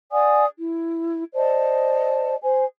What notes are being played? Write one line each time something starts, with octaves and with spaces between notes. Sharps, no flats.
D5 F#5 G#5 D#6
E4
C5 D5 D#5 A5
C5 G#5